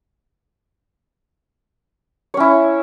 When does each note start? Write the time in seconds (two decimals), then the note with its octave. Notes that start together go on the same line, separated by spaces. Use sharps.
2.34 C#5
2.37 C#4
2.40 E4